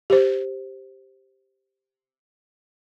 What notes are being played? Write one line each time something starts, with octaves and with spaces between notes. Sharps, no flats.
G4 C5